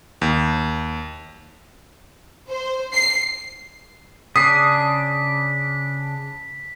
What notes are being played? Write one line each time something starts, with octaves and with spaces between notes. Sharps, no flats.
D#2
C5
C7
C#3 D4 D#6 B6 C7